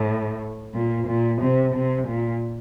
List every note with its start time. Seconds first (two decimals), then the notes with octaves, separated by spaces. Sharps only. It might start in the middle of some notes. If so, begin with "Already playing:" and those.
Already playing: A2
0.75 A#2
1.07 A#2
1.42 C3
1.75 C3
2.08 A#2